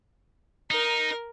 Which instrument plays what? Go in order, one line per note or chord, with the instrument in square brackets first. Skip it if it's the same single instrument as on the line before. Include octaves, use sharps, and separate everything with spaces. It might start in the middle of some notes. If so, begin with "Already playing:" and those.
[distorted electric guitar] D#4 [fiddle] A#4